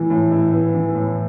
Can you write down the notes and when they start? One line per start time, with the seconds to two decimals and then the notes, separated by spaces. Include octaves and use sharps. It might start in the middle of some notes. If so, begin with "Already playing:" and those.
Already playing: A2 E3 B3 E4
0.10 A2
0.31 E4
0.53 B3
0.74 E3
0.95 A2